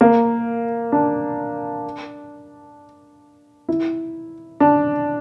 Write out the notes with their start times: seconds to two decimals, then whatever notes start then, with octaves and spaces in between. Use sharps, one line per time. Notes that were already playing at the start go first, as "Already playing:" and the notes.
0.01 A#3
0.92 D4
3.69 E4
4.60 D4